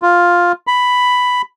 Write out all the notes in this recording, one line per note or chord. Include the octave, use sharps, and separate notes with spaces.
F4
B5